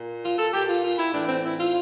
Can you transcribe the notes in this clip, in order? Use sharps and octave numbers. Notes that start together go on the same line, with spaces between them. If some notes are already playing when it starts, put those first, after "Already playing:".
Already playing: A#2
F4
A4
A#2 G4
F4
F4
E4
A2 E3 D4
C4
E4
F4